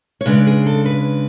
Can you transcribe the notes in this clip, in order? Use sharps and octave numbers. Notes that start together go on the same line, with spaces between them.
C#5
C#3 G#3 D4 B4
G#4
A4
B4